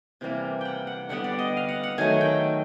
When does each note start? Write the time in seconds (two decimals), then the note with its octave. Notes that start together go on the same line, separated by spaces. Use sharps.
0.21 C3 E3 G3 A#3
0.61 F#5 G5
0.87 F#5
1.09 D3 G3 B3 F#5
1.24 D5
1.39 D#5
1.57 F5
1.69 F#5
1.83 F#5
1.98 D#3 F#3 A3 G#5
2.21 G5